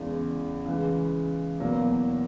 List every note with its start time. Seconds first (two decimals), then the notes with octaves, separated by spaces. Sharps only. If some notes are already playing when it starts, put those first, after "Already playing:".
Already playing: E2 C#3 G#3
0.66 C#3 E3 G#3
1.60 E2 B2 F#3 A#3